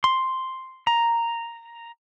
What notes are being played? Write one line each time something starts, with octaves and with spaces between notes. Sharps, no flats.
C6
A#5